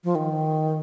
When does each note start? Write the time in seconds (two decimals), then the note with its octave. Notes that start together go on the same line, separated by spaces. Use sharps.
0.04 F3
0.15 D#3